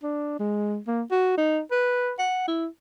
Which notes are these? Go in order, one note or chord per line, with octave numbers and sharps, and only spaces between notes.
D4
G#3
A#3
F#4
D#4
B4
F#5
E4